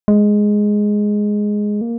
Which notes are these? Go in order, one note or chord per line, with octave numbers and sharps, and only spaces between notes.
G#3
A#3